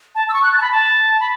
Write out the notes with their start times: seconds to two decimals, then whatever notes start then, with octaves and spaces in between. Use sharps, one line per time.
0.15 A5
0.29 E6
0.33 C#6
0.43 F#6
0.53 A6
0.58 A5
0.62 B5
0.71 A5
1.20 B5